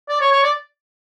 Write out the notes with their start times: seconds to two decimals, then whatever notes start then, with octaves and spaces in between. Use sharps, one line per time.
0.09 D5
0.21 C#5
0.31 C#5
0.43 D5